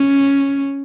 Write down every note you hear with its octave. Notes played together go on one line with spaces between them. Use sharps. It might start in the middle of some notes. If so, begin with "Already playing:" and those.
Already playing: C#4